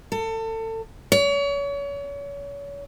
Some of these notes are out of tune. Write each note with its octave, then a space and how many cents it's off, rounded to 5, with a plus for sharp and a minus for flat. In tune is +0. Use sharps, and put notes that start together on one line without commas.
A4 +30
C#5 +35